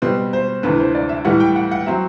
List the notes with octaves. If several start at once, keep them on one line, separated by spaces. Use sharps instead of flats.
B2 G3 C4 B4
C5
D2 C3 E3 B4
C5
D5
E5
A2 E3 G3 F#5
G5
F#5
F#5
F#3 C4 E5